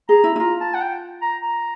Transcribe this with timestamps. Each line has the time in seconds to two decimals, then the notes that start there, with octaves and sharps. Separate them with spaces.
0.09 G#4 A#5
0.24 E4
0.36 E4
0.40 F4 A#5
0.61 A5
0.75 F#5
0.81 G5
1.22 A#5
1.43 A#5